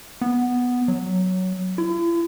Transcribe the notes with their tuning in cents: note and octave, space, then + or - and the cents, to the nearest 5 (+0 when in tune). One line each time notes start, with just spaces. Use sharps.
B3 +0
F#3 +5
E4 +45